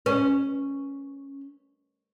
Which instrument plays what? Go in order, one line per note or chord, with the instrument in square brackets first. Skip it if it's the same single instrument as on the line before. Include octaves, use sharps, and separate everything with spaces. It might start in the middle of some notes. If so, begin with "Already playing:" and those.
[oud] C#4 [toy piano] B4